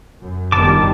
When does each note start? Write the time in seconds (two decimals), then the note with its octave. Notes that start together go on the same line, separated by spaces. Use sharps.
0.20 F#2
0.52 G1 D#3 G3 A5 D6